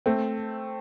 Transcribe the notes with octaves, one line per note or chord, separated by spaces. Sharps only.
A3 C4